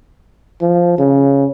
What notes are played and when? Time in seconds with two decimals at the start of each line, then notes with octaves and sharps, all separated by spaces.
0.62 F3
0.98 C#3